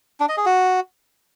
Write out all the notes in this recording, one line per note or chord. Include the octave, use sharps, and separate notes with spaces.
D4
D#5
G#4
F#4